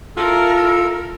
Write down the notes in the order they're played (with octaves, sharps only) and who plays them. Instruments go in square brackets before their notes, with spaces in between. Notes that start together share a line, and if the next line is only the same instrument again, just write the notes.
[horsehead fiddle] E4 A#4 [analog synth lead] F4 [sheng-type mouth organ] A4